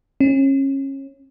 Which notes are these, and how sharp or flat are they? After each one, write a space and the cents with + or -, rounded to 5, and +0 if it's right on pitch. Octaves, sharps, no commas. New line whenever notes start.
C#4 -30